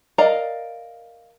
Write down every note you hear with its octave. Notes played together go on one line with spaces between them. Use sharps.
A#4 D5 D#5 F5 A#5